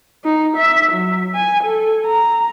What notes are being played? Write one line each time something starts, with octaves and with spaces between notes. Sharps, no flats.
D#4
E5
F#3
G#5
A4
A#5